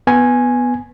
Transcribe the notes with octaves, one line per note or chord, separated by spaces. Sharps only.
B3 G#5